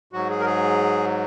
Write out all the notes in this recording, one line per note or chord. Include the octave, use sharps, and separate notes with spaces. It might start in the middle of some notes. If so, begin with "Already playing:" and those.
G#2 F#3 F#4
G#4
A#4
G#4